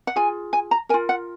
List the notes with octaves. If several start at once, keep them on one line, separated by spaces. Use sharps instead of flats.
F#5
F4 G#4 G#5
G#5
A#5
F4 A#4 G#5
F#5